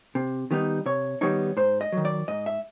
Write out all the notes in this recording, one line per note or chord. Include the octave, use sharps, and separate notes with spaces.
C3
D#3 G3 B3 D#4
C3 C#5
D#3 G3 B3 D#4 C#5
G#2 C5
D#5
D#3 F#3
D5
G#2 D#5
E5